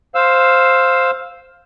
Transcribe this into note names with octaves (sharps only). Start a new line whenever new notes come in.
C5 F5 E6